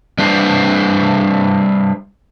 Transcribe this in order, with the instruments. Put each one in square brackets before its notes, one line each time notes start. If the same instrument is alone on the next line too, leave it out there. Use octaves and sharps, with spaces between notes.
[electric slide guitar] G3 D4 B4 C5